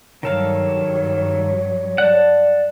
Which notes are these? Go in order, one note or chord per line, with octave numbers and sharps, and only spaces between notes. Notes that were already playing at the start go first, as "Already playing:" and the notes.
G2 D#3 F#3 A4 C#5 F5
D5 F#5 A5